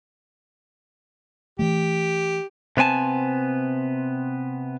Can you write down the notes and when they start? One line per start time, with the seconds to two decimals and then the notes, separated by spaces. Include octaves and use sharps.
1.59 E3 A3 G4
2.77 C3 B3 C4 G#5 A5